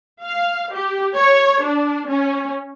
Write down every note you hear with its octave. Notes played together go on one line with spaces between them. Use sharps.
F5
G4
C#5
D4
C#4